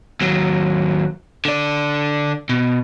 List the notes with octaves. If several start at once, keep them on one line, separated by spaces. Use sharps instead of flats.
D#2 F#3
D3 D5
B2